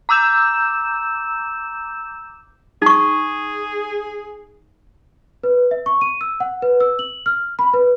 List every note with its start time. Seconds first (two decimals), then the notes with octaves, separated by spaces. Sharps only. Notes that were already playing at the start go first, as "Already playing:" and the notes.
0.09 A#5 D6 E6 G6 E7
2.82 D#4 G#4 C#6
5.44 B4
5.71 E5
5.86 C#6
6.01 D#7
6.21 E6
6.40 F#5
6.62 B4
6.80 E6
6.99 F#7
7.26 F6
7.59 B5
7.74 B4